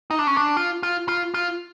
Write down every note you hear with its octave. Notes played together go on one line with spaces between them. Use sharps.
D#4
D4
C#4
D4
F4
F4
F4
F4